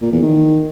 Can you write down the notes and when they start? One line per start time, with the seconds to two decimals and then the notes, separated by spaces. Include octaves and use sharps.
0.02 A#2
0.12 E2
0.23 D#3